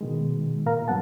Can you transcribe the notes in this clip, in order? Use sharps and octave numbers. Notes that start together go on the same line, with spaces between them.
B2 D#3 G#3
A#2 A#4 F5 A#5
G2 F#3 B3 F#5 A5